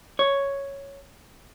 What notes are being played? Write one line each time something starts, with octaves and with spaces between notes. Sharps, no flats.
C#5